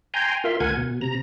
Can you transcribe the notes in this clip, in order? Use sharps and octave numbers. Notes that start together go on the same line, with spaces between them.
G5 G#5 A#5 C6
F4 A#4 E5 C6
D2 A#4 F#5 G#5 G#6
B2
C3 A#5